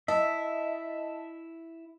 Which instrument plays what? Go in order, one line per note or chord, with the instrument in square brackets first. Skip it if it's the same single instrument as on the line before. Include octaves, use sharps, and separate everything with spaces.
[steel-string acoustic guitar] E4 [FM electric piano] D#5 A5 [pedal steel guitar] E5